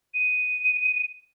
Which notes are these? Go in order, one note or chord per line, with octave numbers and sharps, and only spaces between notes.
D#7